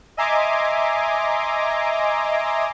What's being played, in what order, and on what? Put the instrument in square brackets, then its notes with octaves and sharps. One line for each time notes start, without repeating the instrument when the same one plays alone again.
[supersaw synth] D#5 E5 G#5 A#5 C6 D6